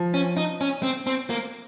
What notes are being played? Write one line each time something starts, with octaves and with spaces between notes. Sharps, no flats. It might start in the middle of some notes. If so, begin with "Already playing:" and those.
Already playing: F3
C#4
D#4
C#4
C4
C4
A#3